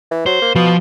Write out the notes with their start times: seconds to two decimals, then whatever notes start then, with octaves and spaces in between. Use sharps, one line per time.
0.11 E3
0.26 F#3 C5
0.42 A#3
0.55 B2 F3